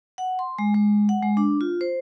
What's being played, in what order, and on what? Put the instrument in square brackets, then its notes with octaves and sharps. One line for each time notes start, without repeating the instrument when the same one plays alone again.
[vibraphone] F#5
C6
G#3
G#3
F#5
G#3
D4
F4
C5